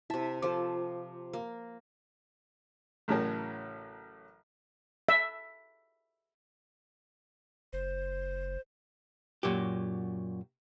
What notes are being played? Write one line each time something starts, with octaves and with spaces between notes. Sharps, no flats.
C3 E4 E5 A5
F3 F4 A4 C5 D6
A#3
A1 A2 C#3 F#3 A#4 A5
E5
F#1 C5
F#2 A#2 F#3 G4